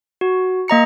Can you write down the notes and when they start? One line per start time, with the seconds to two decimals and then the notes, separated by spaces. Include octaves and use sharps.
0.21 F#4
0.68 A#3 D#5 A#5 C#7